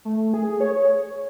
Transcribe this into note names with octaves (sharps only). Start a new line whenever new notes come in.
A3
G#4
C#5